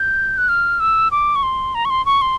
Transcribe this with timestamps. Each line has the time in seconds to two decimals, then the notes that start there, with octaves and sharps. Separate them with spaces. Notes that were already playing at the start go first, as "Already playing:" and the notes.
Already playing: G6
0.38 F#6
0.49 F6
0.80 E6
1.11 D6
1.36 C#6
1.43 C6
1.75 A#5
1.85 C#6
1.90 C6
2.06 C#6
2.22 C6